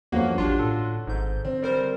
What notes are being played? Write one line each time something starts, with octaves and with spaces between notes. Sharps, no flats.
E2 G2 D3 F3 A#3 C#4 F#4
A1 D4 F4 G4 C6
G1 A2 A4
G#1 G#2 G6
D3 C4
G3 A#4 C5